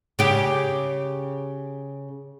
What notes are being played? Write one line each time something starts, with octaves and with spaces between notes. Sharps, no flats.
C#3 G4